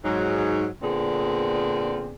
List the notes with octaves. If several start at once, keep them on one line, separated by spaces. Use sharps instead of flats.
G#2 F#3 D#4
A#2 D3 B3 C4 G#4 D5